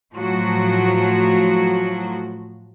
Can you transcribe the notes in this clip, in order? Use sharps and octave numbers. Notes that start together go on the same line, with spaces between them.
A2 F3 F#3 F#4